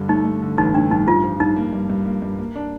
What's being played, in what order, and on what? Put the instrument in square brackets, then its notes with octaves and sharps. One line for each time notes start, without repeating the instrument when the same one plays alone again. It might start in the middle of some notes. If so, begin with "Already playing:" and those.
Already playing: [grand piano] G2 D3
[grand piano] A3 [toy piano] D#4
[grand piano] A3
D3
[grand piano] A1 [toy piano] D#4
[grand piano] A3 [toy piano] D4
[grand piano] G2 [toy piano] D#4
[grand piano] G2 [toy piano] F4
[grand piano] F3
[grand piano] G2 [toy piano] D#4
[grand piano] A#3
G2
G2
A#3
G2
A#3
D4